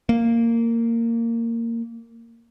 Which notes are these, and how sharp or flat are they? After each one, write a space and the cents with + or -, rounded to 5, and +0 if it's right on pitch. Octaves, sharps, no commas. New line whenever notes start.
A#3 -15